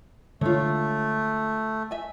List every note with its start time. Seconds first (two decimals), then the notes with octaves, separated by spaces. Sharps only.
0.41 D3 G#3 A3 F4 C#5
1.91 E5 G#5